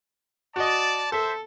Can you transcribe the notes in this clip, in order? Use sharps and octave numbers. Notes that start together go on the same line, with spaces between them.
F#4 D5 D#5 A5
A4 C5 E5